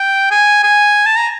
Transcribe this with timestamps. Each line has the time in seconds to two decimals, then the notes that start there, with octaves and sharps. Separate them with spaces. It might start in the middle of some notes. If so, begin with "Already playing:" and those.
Already playing: G5
0.31 G#5
0.63 G#5
1.06 A5
1.17 A#5